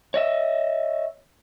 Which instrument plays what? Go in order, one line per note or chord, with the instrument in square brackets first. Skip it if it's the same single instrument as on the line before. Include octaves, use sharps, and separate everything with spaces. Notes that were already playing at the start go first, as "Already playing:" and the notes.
[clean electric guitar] C#5 D#5 E5